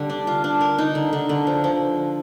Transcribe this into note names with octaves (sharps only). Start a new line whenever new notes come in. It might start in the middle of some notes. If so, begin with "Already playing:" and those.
Already playing: D3 G3
D4
F4
D4
A#4
D#4
D3
D3
D3
F3
F3